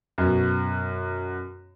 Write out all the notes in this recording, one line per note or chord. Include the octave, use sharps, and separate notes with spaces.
F#2 B2